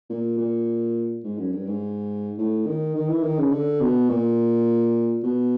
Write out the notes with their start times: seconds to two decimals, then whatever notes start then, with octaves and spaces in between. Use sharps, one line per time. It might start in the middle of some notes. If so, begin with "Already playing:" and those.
0.10 A#2
0.38 A#2
1.24 G#2
1.38 F#2
1.52 G2
1.66 G#2
2.38 A2
2.66 D#3
2.95 D#3
3.09 E3
3.23 D#3
3.38 C#3
3.52 D3
3.81 B2
4.09 A#2
5.23 B2